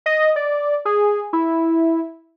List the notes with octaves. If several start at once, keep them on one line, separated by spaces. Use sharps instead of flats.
D#5
D5
G#4
E4